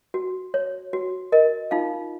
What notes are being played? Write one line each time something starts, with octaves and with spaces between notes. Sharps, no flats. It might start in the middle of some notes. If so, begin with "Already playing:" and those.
F#4
C#5
F#4
A#4 D#5
D#4 F4 F5